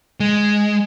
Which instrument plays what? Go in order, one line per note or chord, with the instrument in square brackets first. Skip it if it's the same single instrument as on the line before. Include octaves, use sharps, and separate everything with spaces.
[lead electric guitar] G#3